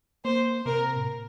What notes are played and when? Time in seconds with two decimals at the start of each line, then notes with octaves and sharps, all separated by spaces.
0.24 A#3 C5
0.65 C3 A#4
0.96 A2
1.06 A#2